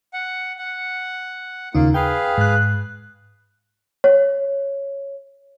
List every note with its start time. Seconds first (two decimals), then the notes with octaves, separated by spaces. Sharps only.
0.13 F#5
0.59 F#5
1.75 D#2 C#3 A#3 D#4 F4
1.94 G#4 B4 F5 G5
2.38 G#2 F#6
4.04 C#5